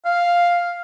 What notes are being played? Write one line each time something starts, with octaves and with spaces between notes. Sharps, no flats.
F5